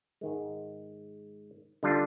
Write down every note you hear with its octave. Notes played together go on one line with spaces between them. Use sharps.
G#2 D#3 G#3
D3 G3 D4 F4